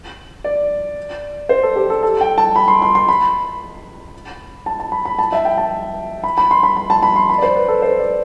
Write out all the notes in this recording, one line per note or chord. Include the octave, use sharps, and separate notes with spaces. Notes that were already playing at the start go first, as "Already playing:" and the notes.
D5
C5
A4
G4
A4
A4
G5
A5
B5
C6
C6
C6
B5
A5
A5
B5
B5
A5
E5
G5
A5
B5
B5
C6
B5
B5
A5
B5
C6
B5
D5
C5
B4
A4
C5
D5